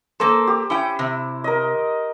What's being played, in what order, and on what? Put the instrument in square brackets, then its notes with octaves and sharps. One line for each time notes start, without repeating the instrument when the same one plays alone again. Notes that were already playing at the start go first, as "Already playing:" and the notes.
[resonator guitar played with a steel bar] A#3 A4 [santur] C5
[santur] G4
[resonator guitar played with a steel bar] C#4 G5 [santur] E4
[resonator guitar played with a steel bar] C3
[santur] A#4 D#5